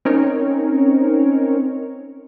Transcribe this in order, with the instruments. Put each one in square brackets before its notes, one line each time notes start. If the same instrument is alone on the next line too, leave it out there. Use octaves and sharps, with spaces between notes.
[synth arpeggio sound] C4 C#4 D#4 A#4 C#5